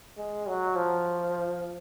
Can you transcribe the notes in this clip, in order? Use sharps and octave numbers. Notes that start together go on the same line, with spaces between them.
G#3
F#3
F3